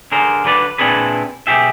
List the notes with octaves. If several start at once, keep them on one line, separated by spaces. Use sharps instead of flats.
D3 G#4 A#4 C5
D3 F#3 B4 D5
A#2 C4 D4 E4 G#4 B4
B1 B2 G4 G#4 E5